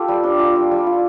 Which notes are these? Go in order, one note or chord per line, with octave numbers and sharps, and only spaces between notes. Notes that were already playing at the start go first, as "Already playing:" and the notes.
Already playing: F4 G4 A4
G3
D4
F4
G3
G3
F4